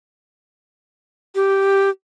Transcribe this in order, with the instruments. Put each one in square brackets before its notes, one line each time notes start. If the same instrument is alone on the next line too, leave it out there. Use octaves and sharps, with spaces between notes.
[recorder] G4